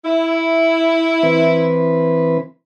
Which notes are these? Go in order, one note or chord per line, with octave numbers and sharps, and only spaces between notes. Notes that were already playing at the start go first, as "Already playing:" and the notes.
E4
E3 C4 B4